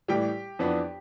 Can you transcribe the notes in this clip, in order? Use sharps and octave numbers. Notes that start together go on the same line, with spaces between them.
A2 E3 G3 G4 G5
F2 E3 B3 D4